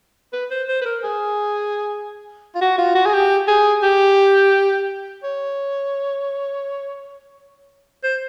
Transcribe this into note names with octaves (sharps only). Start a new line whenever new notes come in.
B4
C5
C5
B4
A#4
G#4
F4
F#4
F4
F#4
G#4
G4
G#4
G4
C#5
C5